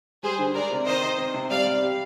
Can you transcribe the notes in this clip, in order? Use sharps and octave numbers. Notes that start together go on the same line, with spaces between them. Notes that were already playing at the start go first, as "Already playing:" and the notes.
G3 G#4 C5
D3
G#3 A#4 D5
C3
D#3 C5 D#5
D#4
C4
C3
G3 D5 F5
G3
G4